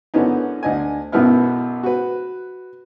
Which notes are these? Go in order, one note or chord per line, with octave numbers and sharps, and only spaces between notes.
F#2 D3 E3 B3 C#4 D#4
D2 D#5 G#5
B1 F#2 B2 B3 E4 F6
F#4 B4